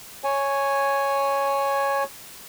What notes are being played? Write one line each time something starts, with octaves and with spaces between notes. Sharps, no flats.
C#5 G#5